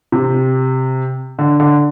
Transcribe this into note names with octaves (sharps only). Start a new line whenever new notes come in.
C3
D3
D3